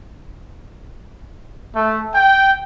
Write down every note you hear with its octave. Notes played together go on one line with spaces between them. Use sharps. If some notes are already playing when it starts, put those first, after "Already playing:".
A3
G5